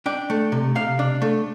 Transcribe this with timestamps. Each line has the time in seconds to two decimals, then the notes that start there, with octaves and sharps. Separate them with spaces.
0.06 D4 G5
0.30 A3
0.52 C3
0.75 C3 F5
0.99 D4
1.22 A3